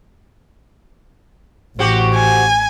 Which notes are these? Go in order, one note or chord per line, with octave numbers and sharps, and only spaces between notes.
A1 C4 F#4 G4
G#5